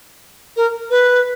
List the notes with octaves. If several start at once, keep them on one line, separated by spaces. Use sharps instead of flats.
A#4
B4